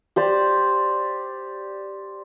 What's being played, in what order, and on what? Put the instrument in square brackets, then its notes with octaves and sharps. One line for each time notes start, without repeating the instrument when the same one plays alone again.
[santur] G4 C5 D5